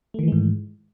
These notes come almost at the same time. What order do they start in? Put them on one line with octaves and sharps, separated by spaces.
A3 D#3 E3 G#3 G#2